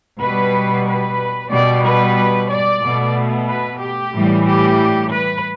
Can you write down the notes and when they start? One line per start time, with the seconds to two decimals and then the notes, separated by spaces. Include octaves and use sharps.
0.21 B2 G3 B4
0.87 B4
1.52 B2 G3 D5
1.85 B4
2.49 D5
2.82 B2 A3
3.48 B4
3.80 G4
4.13 A2 E3 G3
4.46 G4
5.11 B4